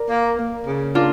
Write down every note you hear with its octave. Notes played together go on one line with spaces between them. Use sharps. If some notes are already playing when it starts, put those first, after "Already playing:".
Already playing: A#4 D5
A#3
A#3
C#3
A#3 D4 F4